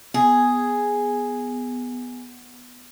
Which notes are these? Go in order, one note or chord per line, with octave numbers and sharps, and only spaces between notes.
B3 G#4